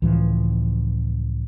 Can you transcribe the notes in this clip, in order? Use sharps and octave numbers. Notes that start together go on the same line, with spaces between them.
C#2 A2 E3 F3